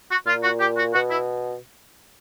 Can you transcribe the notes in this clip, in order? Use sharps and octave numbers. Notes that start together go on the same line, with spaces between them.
F#4
A#2 F4
F#4
G4
F#4
B2 F#4
E4